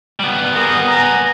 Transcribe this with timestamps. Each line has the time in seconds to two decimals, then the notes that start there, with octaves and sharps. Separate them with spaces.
0.19 G3 B3
0.55 G#4 A#4
0.88 G#5 A#5